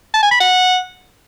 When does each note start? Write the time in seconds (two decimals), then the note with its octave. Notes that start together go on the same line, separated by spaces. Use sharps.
0.14 A5
0.23 G#5
0.31 B5
0.40 F#5